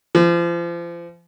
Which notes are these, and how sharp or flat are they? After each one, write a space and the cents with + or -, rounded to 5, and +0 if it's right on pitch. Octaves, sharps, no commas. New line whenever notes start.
F3 -35